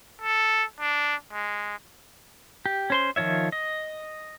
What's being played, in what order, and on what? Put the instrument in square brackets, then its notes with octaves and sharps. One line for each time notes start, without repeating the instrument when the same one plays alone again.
[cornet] A4
D4
G#3
[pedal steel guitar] G4
C#4 C5 C6
D#3 F3 F4 C#5 E5
D#5